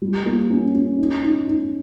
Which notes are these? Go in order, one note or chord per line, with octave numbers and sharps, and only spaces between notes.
G3
A#3
C#4
C#4
D#4
D#4
D#4